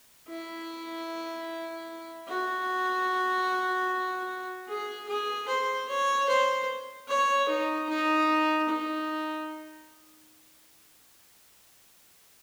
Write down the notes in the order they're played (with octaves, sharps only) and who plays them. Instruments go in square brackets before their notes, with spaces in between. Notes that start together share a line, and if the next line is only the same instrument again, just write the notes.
[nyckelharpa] E4
F#4
G#4
G#4
C5
C#5
C5
C#5
D#4
D#4
D#4